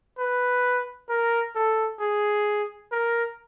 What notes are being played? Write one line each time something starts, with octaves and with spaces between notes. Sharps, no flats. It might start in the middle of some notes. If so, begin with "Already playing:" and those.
B4
A#4
A4
G#4
A#4